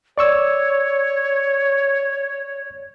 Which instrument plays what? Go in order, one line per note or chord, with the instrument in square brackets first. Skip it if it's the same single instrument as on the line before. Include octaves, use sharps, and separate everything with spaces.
[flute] C#5 [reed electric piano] D5 C#6 E6